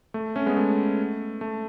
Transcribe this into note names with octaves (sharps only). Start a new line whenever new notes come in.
A3
A3 C#4
G#3 B3
A3
A3